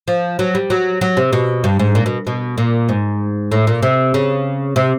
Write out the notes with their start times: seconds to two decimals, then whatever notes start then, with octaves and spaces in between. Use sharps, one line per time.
0.08 F3
0.39 F#3
0.55 G3
0.70 F#3
1.01 F#3
1.17 C3
1.33 B2
1.64 G2
1.79 G#2
1.95 A#2
2.06 B2
2.27 B2
2.58 A#2
2.89 G#2
3.52 A2
3.67 A#2
3.83 C3
4.14 C#3
4.76 C3